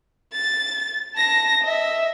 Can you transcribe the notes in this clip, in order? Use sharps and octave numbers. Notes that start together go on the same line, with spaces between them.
A6
A5 A#6
D#5 E5